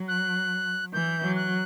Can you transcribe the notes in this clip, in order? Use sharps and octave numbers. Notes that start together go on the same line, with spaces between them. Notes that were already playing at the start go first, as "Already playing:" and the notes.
Already playing: F#3
F#6
E3 G6
F#3
F#6